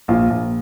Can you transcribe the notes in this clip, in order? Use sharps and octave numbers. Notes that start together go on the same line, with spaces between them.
A#1 F4
A#1